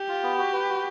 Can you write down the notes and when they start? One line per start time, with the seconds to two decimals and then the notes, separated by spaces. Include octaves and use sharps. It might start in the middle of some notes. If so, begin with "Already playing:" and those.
Already playing: G4
0.09 F4
0.23 B3
0.38 F#4
0.53 B4
0.69 F#4